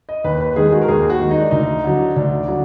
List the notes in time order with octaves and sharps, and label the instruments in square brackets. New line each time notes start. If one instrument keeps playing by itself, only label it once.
[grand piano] D#5
D#2 B4
B4
D#3 G#3 G#4
F#4
A#4
D#2 G#4
F#4
D#3 G#3
D#4
D4
D2 D#4
D3 F#3
D2 D4
D3 F#3